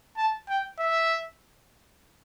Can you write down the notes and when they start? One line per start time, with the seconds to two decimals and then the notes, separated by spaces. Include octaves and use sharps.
0.17 A5
0.49 G5
0.79 E5